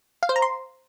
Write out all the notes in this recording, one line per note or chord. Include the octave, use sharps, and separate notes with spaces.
F5
C5
A#5
C6